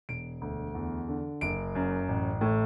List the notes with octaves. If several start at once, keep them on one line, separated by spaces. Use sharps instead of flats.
E1 D7
D2
E2
D3
F#1 D7
F#2
A1
A2